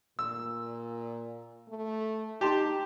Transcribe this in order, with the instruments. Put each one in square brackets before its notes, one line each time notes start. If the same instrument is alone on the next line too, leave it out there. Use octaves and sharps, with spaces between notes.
[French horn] A#2 [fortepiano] E6
[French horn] A3
[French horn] D#4 [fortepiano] G4 A5 C6